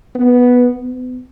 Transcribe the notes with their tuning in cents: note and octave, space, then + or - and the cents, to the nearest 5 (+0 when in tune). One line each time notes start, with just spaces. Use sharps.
B3 -5
B3 +35